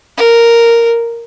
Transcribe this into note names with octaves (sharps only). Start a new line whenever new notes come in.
A#4